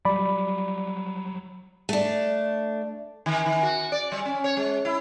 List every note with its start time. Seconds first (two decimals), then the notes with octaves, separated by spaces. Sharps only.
0.05 F#3 G3 D5 B5
1.89 A3 D4
3.26 D#3
3.46 D#3
3.63 F#4
3.92 D5
4.12 G3
4.25 C#4
4.44 C#5
4.57 G#3
4.85 E4